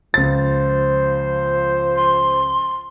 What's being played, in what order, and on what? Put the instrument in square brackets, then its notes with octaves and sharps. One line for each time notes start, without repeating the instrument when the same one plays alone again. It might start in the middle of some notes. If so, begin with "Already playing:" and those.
[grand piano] C#2 A6 [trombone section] F3 C5
[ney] C6